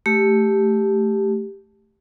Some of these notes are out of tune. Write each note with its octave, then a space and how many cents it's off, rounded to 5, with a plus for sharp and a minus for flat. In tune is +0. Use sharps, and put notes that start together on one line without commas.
A3 -5 G4 +0